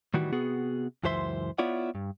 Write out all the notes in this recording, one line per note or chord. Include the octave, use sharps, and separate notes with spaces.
A2 D#3 E3 G3 F#4
C3 B3 F#4 G#4
C#2 F#2 E3 C5 E5 C6
B3 E4 F4 C#5 D5 F#5
G2